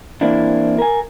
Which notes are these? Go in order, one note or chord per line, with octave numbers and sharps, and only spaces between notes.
E3 A#3 C4 D4 E4
A#4 G#5